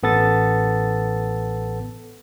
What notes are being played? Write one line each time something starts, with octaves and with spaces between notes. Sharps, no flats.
A1 B3 A4 A6